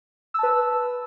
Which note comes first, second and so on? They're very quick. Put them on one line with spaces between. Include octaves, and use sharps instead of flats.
E6 A5 B4